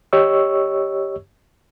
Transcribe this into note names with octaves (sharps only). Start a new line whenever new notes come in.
G4 C#5 D#5 C#6 E6